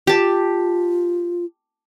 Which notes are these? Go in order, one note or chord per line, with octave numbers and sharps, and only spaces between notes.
F4 G4 A5